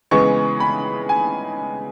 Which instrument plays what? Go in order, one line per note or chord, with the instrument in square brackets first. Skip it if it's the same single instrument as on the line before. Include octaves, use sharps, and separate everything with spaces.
[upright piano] C#3 E3 G#3 B3 C#6
B5
G#5